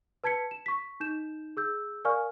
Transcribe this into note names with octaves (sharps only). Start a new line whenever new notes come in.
B4 A5 G#6 B6 C#7
E7
C#6 B6
D#4 G6 E7
G#4 E6 G6
A#4 D5 F5 G#5 C#6 F6